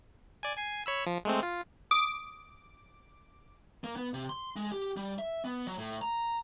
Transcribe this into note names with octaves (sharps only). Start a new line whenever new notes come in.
D5 G#5
G#5 C7
C#5 B5 E6
F3
G#3 A3 C4
F4
D6 D#6
A#3
B3
C3
C6
G#3
G4
G3
E5
B3
F#3
A2
A#5